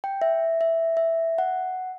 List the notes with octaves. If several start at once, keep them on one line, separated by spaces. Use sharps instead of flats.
G5
E5
E5
E5
F#5